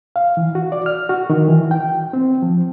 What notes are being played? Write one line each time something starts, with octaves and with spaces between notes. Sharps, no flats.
F5
E3
F#4
D5
F6
F#4
D#3
E3
G5
C4
F3